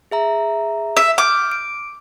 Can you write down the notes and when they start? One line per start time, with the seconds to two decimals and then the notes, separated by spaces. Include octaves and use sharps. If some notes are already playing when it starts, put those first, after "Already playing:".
0.11 G#4 E5 A#5
0.97 E5
1.18 D6 E6 F6 G6
1.52 D7